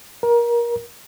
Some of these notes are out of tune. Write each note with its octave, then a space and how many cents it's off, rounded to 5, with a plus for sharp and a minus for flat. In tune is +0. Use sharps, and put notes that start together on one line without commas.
A#4 +25